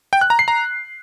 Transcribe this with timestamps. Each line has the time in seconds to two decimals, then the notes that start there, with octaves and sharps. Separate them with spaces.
0.13 G5
0.21 F#6
0.30 A#5
0.39 C7
0.48 A#5